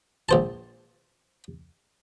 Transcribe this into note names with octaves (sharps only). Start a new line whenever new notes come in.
A#1 C5 A5